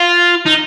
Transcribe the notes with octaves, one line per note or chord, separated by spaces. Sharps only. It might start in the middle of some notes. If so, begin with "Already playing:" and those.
Already playing: F4
D#4